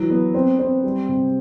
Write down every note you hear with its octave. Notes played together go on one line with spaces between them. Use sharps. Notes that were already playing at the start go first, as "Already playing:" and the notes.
Already playing: E3 F#3
B3
C4
C4
G3
C3